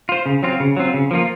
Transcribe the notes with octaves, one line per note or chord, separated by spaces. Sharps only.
F4 C5
C#3
F#3 C4 F4
C#3
F#3 C4 F4
C#3
F3 A#3 F4